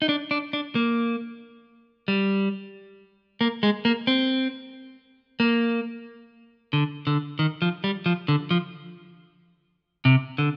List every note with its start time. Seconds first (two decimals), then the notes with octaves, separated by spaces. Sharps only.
0.02 D#4
0.09 D4
0.31 D4
0.53 D4
0.75 A#3
2.08 G3
3.41 A#3
3.63 G#3
3.85 A#3
4.07 C4
5.40 A#3
6.73 D3
7.07 D3
7.39 D#3
7.62 F3
7.84 G3
8.06 F3
8.28 D3
8.51 F3
10.05 C3
10.38 D3